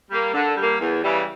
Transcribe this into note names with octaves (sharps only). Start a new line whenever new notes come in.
G3 A#3
D3
G3 A#3
E2
C#3 E3 G3